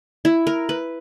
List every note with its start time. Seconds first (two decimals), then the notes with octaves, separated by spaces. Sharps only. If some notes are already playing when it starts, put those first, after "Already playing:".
0.25 E4
0.47 A#4
0.69 B4